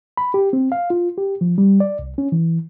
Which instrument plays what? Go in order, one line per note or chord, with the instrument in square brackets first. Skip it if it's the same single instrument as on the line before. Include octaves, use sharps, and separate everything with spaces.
[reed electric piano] B5
G4
C4
F5
F4
G4
F3
G3
D5
C2
C#4
E3